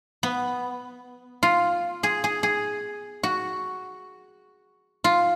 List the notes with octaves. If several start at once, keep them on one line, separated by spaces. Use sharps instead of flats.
B3
F4
G#4
G#4
G#4
F#4
F4